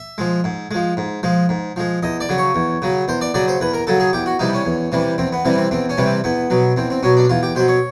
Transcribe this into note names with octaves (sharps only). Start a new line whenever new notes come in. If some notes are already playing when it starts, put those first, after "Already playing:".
Already playing: E5
F3 G#3
G#2
F3 G#3
G#2
F3 G#3
G#2
F3 G#3
E2 D#5
D5
C#3 F#3
C#5
E2
C#3 F#3
E2 C5
D5
C#3 F#3 D5
C5
E2 B4
A#4
C#3 F#3 A4
G#4
E2 G4
F#4
C3 E3 G3 D#4
C#4
E2
C3 E3 G3
E2 C4
B3
C3 E3 G3 C4
C4
E2 C4
C#4
C3 E3 G3
C4
E2 B3
B2 F#3
E2 C4
C4
B2 F#3 C#4
D4
E2 F4
G4
B2 F#3 C5
C#5